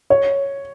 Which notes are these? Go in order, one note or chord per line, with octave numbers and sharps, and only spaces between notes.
C#5